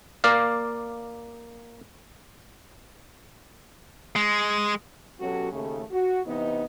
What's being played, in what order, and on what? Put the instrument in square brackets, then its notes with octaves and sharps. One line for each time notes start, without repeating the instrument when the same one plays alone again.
[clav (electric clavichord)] A#3 D5 F5
[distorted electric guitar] G#3
[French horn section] B2 F#3 C#4 F#4 G4 A4
D#2 C#3 A3
F#4
C3 E3 B3 D#4 D#5